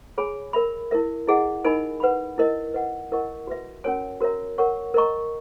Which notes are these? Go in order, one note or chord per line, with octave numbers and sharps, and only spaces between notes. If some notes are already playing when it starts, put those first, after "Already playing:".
G#4 C#5 G#5 B5
A#4 E5 B5
E4 A#4 E5
E4 G#4 D#5 F#5
D#4 A#4 D#5 G#5 B5
B4 F#5 B5
E4 A#4 D#5
B4 D#5 F#5
E4 A#4 D#5 F#5 C#6
F#4 B4 E5
C#4 F#4 A#4 C#5 G#5
F#4 A#4 C#5 E5 A#5
A#4 C#5 F#5 C#6
A#4 D#5 A#5 C#6